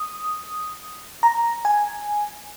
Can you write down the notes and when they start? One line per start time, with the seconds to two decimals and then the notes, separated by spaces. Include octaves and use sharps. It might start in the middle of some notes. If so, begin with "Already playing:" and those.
Already playing: D#6
1.23 A#5
1.65 G#5